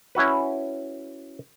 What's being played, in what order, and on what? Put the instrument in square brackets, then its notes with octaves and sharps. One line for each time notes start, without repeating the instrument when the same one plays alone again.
[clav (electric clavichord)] C#4 E4 F#4 B4